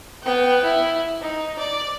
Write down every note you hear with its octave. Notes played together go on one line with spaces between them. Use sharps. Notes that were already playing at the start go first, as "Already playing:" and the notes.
B3 G5
E4
D#4
D5